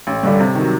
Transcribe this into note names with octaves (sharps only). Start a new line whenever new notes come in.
A1
G2 D3 G3
C3
D#3
F#3